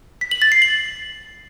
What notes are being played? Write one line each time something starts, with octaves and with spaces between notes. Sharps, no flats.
B6
F#7
A6
C7
F#7